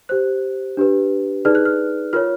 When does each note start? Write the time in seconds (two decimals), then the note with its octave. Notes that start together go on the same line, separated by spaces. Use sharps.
0.09 G4 C5 F#6
0.77 D4 G4 B4
1.45 D#4 G#4 B4 D5 F6
1.55 F#6
1.65 F6
2.13 F4 A#4 C#5 F6